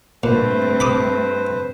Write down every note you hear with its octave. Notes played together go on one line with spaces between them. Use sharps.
G2 A#2 A3 C4 B4 C5
B5 D6 D#6